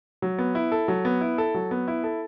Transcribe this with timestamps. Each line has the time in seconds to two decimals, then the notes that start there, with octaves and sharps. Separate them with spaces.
0.22 F#3
0.38 B3
0.55 E4
0.72 A4
0.88 F#3
1.05 B3
1.21 E4
1.38 A4
1.54 F#3
1.71 B3
1.88 E4
2.04 A4